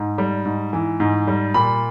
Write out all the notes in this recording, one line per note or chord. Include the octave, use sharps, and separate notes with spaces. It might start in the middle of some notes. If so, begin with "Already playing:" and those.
Already playing: G#2
G3
G#2
E3
G#2
G3
A#2 B5